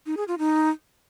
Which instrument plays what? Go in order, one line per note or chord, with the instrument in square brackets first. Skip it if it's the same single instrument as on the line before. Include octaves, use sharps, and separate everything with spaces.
[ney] D#4
G#4
F4
D#4